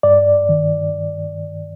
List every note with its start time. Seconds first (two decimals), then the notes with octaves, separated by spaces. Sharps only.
0.03 G2 D5
0.49 D#3